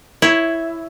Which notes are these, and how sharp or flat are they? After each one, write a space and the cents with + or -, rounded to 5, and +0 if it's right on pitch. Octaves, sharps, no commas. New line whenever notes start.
E4 +0 C#5 +0